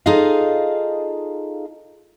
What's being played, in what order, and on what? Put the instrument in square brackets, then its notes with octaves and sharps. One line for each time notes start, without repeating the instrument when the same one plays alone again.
[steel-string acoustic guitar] D#4 F4 G#4 A4 D#5 F5